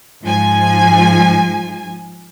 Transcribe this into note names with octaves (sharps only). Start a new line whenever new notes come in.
G#2 F3 G#5